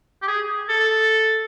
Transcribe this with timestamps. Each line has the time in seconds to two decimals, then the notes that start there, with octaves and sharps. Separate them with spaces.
0.22 G4
0.27 G#4
0.69 A4